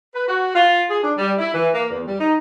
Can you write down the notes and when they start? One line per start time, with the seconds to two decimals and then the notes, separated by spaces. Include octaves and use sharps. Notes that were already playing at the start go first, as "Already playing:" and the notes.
0.14 B4
0.28 F#4
0.54 F4
0.89 G#4
1.02 D4
1.18 G3
1.37 E4
1.53 E3
1.73 A#3
1.90 E2
2.07 G3
2.20 D#4